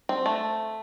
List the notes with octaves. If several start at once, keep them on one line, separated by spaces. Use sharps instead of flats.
C4
A3